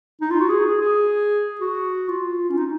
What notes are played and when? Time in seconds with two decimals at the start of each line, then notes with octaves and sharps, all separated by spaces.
0.21 D#4
0.31 F4
0.40 F#4
0.50 G#4
0.66 G#4
0.82 G#4
1.61 F#4
2.08 F4
2.50 C#4
2.57 D#4